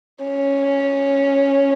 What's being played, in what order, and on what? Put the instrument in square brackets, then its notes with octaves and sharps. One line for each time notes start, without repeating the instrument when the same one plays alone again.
[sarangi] C#4